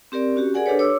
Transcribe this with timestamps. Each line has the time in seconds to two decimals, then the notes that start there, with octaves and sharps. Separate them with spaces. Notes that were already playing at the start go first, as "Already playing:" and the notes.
0.12 C4 G4 A#4 D5
0.36 C#4 F#4 G4
0.54 G#4 A#4 D5 F#5 G#5
0.66 D4 G4 A4 B4 C#5
0.79 C#5 D6 E6